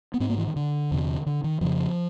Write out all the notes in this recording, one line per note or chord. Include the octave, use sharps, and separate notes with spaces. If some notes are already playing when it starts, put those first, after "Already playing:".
B3
G#2 C4
A#3
E3
D#3
D3
E2 C3
D3
D#3
F2 C#3 F3